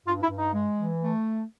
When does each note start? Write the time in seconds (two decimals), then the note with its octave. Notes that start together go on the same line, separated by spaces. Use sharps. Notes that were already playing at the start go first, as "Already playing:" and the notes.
0.06 G2 F4
0.22 E4
0.30 G2
0.38 D#4
0.54 G#3
0.78 E3
1.02 A3